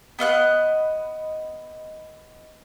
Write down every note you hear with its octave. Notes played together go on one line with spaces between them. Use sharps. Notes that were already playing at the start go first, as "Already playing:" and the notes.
B3 D#5 F5 F#6